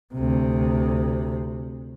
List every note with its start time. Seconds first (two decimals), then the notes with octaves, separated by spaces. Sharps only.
0.14 D2 C3